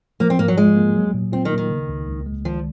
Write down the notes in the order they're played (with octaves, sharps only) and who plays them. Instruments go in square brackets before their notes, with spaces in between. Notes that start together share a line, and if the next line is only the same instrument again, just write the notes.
[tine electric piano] F3 [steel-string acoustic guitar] A#3
[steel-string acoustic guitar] C4
[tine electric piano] G#2 [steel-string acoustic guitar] A#3
[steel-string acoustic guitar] F#3
[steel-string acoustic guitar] G#3 [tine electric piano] F4
[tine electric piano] A#3
F#3
A#2
[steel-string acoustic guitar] C4 [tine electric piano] F4
[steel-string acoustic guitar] D#3
[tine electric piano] A#3
[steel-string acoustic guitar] D#3
[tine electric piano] C#3
C#2
C#2
G#3
[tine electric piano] D#3 [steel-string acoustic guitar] F3